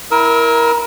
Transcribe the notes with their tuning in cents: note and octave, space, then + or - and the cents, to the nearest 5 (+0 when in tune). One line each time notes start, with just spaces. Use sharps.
E4 -10 A#4 +15 E6 -30